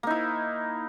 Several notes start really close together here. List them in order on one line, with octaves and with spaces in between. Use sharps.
A#3 D#4 E4